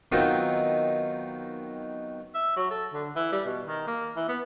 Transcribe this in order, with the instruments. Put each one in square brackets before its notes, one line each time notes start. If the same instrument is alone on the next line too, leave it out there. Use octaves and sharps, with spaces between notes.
[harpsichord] D#3 F#3 B3 C4 D#4 F4
[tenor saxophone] E5
F#3
A4
D3
E3
G3
B2
D#3
A#3
E3
B3